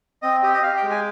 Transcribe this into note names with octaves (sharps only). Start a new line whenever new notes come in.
C4 D#5
G4 D#5
D#5
G4 F5
G5
G#3
G#5